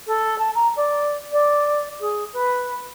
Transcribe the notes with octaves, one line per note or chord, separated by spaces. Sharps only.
A4
A5
A#5
D5
D5
G#4
B4